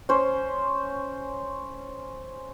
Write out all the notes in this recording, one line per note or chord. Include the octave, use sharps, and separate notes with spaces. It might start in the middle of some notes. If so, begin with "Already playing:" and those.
C#4 C5